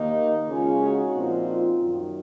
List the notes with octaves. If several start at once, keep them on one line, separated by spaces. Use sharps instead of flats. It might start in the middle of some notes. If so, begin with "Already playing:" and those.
Already playing: D#2 D#3 A#3 D#4
C#3 G#3 C#4 F4
D#4 F#4
A#2 F3 C4 D#4
F4
F#2 D#3 F#3